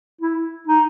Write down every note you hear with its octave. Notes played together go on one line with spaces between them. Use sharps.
E4
D#4